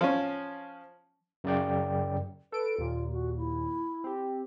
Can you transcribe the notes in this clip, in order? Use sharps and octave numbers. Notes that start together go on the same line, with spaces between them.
F3 C#4
F#2 C#3 D5 G5
A4 B4 D7
D#2 A#2 F4
F#4
E4
C4 G4